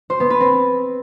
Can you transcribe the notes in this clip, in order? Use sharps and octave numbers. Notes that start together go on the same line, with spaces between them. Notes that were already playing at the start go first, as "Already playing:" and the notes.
C5
B3
B4
C4